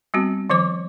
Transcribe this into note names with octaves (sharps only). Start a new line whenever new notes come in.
G3 B3 C4 F#4
D#3 F3 C5 D6